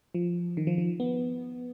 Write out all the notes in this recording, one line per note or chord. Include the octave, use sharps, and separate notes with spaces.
F3
D#3
F3
F3
B3